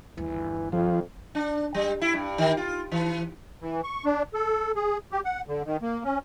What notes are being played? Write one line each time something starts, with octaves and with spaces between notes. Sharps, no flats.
G1 D#2 E3
F2 F3
D4
G3
E4
G2
D#3
F4
E3
E3
C#6
D4
A4
G#4
G4
F#5
D3
D#3
A#3
C#4